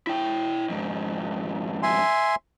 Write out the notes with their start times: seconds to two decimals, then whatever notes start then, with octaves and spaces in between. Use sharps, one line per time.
0.07 E4 G5
0.69 F2 G#2
1.83 E5 G#5 C6